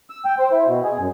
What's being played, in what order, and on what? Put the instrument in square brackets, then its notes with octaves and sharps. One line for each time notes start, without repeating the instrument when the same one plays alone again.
[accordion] E6
G5
C5
E4
B2
G#4
F#2